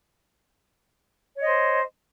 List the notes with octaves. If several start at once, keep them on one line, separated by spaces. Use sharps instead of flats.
C5 C#5 D#5